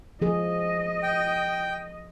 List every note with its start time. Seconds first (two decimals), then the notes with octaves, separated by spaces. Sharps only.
0.22 F3 G#4 D#5
1.03 G5